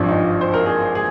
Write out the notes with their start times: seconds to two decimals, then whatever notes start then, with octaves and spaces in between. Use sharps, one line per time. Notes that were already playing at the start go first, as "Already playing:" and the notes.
Already playing: G#1 G2 F3 D4
0.09 D#4
0.41 C5
0.54 A#4
0.66 G#4
0.95 G#4